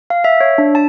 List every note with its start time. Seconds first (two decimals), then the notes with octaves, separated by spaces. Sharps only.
0.10 F5
0.24 E5
0.40 C#5
0.58 D4
0.75 A5